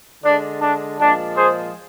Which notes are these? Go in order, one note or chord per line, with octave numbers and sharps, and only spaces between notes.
D3 G#3 D4
D4
A#2 F3 G#3 D4
G#4 C5